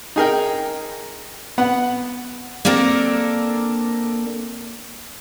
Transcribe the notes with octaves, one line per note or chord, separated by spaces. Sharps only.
D#4 G#4 A#4 G5
B3 F#5
A#3 C4 D4 A4 A#4